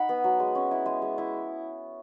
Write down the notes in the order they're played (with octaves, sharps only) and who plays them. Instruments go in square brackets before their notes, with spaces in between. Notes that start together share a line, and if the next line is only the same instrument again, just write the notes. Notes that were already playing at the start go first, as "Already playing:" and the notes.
Already playing: [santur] D#4 F#5 B5
B3
F#3
G#3
C#4
E4
G#3
G#3
E4